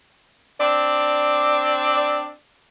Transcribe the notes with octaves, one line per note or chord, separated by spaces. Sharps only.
C4 D4 D5